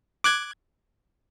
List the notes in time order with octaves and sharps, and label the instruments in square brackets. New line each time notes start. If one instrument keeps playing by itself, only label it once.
[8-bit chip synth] D6 F#6 G#6